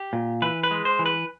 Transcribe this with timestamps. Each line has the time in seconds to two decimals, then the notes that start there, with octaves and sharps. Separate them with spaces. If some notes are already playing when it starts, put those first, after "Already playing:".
Already playing: G4
0.13 A#2
0.42 E3 B4
0.63 B4
0.71 G#3
0.85 C5
0.99 E3
1.06 B4